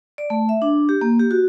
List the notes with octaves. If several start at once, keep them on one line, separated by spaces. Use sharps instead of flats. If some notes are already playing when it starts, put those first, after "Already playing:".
D5
A3
E5
D4
G4
A#3
G4
F#4